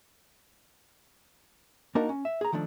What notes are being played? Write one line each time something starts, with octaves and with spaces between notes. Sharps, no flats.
A#3 D4 D#4 F#4 A#4
C#4
E5
G#4 A#5
D#3 F3 A3 D4